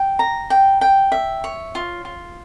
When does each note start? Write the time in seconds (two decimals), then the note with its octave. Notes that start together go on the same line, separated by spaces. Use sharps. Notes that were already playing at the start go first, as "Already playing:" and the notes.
Already playing: G5
0.19 A#5
0.50 G5
0.81 G5
1.12 E5
1.44 C#5
1.75 F4
2.05 F4